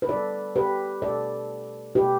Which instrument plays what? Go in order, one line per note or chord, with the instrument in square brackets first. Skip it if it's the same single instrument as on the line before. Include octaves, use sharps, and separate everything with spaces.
[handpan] B4
D3 G3 A4 D5
G4 B4
B2 A3 A4 D5
B2 A3 G4 B4